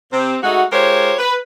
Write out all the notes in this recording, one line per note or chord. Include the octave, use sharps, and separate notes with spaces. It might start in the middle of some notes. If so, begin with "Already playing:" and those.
C3 C4
G#3 A3 D#4 F#4
G#3 F4 G4 A#4 C5 C#5
B4